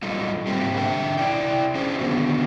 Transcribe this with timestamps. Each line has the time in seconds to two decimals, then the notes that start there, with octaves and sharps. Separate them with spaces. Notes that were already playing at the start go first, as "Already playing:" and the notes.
0.03 F#3 G3 D#4 F4 A4
0.47 G#2 G3 A3 A#3 C4 G4
0.76 D3 E5 G5
1.18 E4 D5 G5
1.75 C#4 D4 G#4 C5
1.99 D3 D#3 B3 C#4 F4 F#4